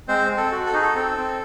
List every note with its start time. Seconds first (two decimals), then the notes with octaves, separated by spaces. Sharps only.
0.08 G#3 C4 C5
0.30 C4
0.37 A4
0.52 F#4
0.66 A4
0.73 D#4 G#4
0.83 A4
0.95 C4
1.17 C4